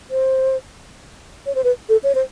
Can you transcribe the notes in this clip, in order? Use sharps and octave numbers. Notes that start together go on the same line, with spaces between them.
C5
C#5
C5
B4
A4
C#5
C5